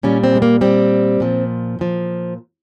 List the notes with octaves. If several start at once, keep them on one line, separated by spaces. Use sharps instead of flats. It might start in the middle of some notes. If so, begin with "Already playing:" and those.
A#2 G3 C#4
C4
G#3
A#3
A#2 G3 C4
A#2 F3
A#2 F3